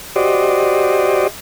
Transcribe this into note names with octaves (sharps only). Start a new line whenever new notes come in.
F#4 G4 C5 D5 D#5